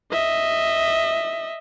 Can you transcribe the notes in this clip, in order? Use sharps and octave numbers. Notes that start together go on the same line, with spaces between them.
D#5 E5